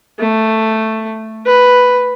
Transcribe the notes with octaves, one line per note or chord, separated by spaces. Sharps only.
A3
B4